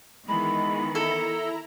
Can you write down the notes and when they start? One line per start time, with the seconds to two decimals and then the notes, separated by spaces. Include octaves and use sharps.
0.28 D#3 E3 G#3 B3 B5
0.95 E4 A4 A#5